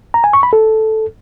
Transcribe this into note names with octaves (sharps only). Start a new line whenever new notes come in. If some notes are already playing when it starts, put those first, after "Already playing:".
A#5
G#5
C#6
B5
A4